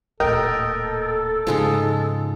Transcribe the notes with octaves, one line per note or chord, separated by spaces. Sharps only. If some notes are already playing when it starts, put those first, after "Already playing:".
D1 A#2 A4 A#4 D#5 G5
G#2 C#3 F3 G#3 D#4